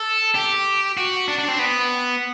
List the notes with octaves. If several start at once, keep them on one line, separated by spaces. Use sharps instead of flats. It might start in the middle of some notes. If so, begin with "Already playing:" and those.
Already playing: A4
G4
F#4
D4
D4
C4
B3